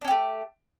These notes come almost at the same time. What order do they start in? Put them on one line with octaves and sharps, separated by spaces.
D4 C#4 G4 A3